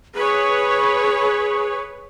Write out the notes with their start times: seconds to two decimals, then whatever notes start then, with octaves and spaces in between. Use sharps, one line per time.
0.15 G#4 B4 C#5